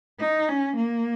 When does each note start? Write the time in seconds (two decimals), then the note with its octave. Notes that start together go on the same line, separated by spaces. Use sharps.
0.20 D#4
0.49 C#4
0.76 A#3